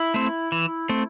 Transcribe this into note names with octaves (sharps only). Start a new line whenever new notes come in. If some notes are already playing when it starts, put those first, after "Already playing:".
Already playing: E4
A3 C4
E3
A3 C4